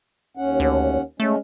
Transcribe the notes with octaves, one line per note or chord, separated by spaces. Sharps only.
D#2 C#4 F#5
D2
G#3 A3 C#4